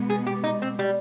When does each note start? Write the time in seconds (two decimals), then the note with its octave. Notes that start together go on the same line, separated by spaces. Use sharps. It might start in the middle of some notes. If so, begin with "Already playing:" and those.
Already playing: B2 G#3 B3
0.10 G#4
0.26 G4
0.44 D#4
0.62 C4
0.79 G3